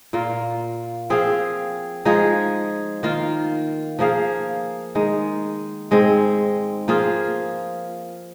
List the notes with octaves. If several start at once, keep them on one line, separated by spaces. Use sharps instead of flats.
A#2 A#3 F4
F3 C4 G#4 F5
F3 G#3 D#4 G#4
D#3 A#3 F4
F3 A#3 G#4 F5
D#3 G#3 D#4
G#2 G#3 C4
F3 A#3 F4 G#4